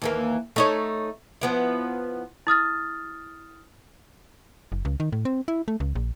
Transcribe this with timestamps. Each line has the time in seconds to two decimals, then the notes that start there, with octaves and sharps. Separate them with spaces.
0.02 D#2 E3 A#3
0.56 A3 D#4 C#5
1.41 F3 B3 E4
2.47 E4 D#6 F6 A6
4.72 F#1
4.85 C#2
5.00 D#3
5.12 A2
5.25 C4
5.48 E4
5.68 A3
5.80 C#2
5.95 A#1